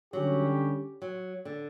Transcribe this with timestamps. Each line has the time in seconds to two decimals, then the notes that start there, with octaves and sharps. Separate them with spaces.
0.13 D3 F#3 G3 C#4 G4
1.02 F#3
1.45 D3